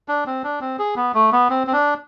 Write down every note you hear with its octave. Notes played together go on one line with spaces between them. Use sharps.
D4
C4
D4
C4
G#4
B3
A3
B3
C4
C4
D4